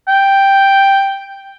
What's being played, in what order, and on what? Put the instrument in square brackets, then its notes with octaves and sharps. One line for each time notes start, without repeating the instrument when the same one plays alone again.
[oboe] G5